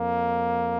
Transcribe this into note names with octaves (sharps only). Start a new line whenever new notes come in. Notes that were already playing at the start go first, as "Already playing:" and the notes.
Already playing: F2 A#3